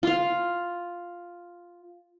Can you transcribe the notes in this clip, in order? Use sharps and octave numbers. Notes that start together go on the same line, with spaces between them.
F4 F5